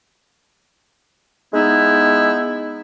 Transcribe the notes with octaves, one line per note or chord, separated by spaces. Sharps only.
G#3 B3 D#4 E4